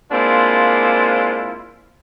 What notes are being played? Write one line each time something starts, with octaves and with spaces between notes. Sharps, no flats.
G#3 A#3 C4 D4 E4 F4